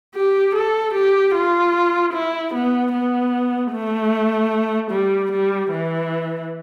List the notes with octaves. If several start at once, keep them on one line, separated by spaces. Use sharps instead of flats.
G4
A4
G4
F4
E4
B3
B3
A3
G3
G3
E3